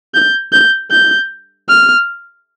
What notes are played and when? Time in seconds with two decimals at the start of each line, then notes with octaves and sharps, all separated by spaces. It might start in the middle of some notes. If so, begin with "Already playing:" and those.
0.14 G6
0.53 G6
0.91 G6
1.69 F6